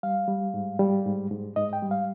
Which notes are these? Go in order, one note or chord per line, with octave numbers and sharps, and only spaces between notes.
G3 F5
G3
G#2
G3
G#2
G#2
G#2 D#5
G5
G3
F5